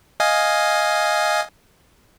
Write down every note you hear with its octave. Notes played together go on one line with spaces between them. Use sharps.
D#5 F5 G#5